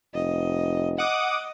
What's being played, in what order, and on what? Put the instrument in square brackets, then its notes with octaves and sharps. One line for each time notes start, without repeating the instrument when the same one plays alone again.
[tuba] F1 [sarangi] D#5
[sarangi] D#5 [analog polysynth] F#5 D6 D#6